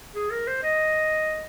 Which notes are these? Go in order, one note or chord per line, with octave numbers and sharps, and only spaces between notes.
G#4
A#4
C5
D#5